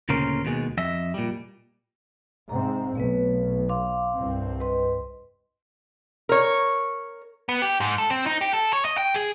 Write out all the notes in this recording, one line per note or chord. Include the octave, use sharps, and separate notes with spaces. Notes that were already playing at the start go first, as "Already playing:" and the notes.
D2 A#2 C#3 C#4 A#4 C5
D#2 B2 G#3
F2 D#5 E5
A#2 G3
G#2 C3 C4 A#5
B1 A3 B3 B4
F5 C6 D6
C2 G2 C4
B4 D#5 C6
A#4 C#5
B3
G4
G#2
A4
C4
D#4
G4
A4
C#5
D#5
G5
G#4